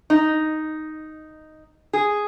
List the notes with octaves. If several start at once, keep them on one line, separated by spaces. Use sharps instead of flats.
D#4
G#4